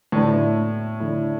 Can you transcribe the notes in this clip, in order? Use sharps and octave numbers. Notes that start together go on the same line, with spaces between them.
A2 D3 A3 E4
A2
D3 A3 E4